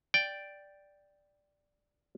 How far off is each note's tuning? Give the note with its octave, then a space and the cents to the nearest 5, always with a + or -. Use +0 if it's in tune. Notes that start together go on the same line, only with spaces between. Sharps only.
D5 +0 G5 +0